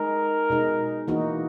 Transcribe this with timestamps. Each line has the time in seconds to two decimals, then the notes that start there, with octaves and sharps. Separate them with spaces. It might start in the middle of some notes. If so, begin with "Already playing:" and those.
Already playing: G#3 D#4 G#4 A#4
0.50 B2 G#3 D#4
1.08 E3 A#3 D#4 F#4